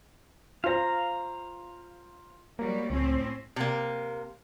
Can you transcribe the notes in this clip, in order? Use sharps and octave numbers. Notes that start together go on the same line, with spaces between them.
F4 C5 F5 A#5
F#3 G3 A#3
C#2 A2 C4 C#4
C3 A#3